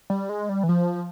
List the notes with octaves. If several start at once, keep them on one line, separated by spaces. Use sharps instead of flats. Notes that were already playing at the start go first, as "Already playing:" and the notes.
G3
G#3
G3
E3
F3